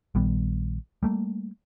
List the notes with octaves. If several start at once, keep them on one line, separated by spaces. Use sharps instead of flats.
A#1 D#3 G3 B3
G3 A3 A#3